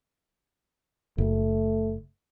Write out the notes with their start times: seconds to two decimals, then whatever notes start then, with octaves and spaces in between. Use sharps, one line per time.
1.18 F#1 A3